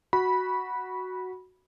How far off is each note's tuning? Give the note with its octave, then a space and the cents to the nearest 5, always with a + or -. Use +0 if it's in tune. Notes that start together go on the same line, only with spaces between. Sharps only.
F#4 +0 B5 -15